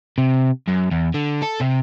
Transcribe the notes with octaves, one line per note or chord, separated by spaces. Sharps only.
C3
F#2
E2
D3
A4
C3